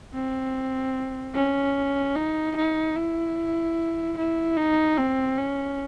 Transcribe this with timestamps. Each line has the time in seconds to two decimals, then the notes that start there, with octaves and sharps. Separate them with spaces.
0.14 C4
1.35 C#4
2.16 D#4
2.56 D#4
2.96 E4
4.17 E4
4.57 D#4
4.98 C4
5.38 C#4